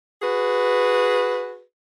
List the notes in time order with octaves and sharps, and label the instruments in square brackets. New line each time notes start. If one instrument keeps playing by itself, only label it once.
[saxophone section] F#4 G#4 B4